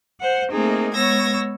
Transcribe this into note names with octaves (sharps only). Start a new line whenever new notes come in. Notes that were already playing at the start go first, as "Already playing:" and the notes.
C5 F#5
A3 A#3 C4 D#4 G#4
G#3 B3 C#5 E6 G#6 A#6